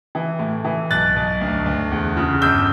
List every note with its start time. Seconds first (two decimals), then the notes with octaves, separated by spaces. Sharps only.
0.15 E3
0.39 A2
0.65 E3
0.90 B1 F#6 A6
1.16 B1
1.41 D2
1.66 D2
1.91 E2
2.17 C#3
2.42 G1 E6 G6